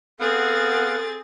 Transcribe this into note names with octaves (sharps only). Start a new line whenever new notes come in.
B3 C4 G#4 A4 F5 F#5 A6